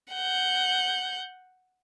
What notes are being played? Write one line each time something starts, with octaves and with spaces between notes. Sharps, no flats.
F#5 G6